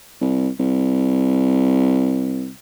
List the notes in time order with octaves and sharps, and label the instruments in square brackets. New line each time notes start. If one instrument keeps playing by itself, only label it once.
[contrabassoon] C2
C2